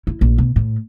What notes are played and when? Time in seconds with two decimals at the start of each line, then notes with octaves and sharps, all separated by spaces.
0.07 E4
0.21 A#1
0.38 B2
0.56 A2